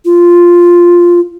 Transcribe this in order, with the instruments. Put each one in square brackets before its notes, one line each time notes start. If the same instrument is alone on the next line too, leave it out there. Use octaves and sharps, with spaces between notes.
[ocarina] F4